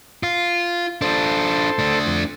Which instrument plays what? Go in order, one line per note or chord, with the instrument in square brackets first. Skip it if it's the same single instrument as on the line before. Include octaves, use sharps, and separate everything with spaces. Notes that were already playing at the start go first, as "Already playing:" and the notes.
[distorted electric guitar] F4
[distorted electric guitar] D4 F4 [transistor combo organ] A4 C5
[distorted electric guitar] A3 D4
[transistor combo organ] F2